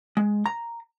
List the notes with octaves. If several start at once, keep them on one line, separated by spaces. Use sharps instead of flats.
G#3
A#5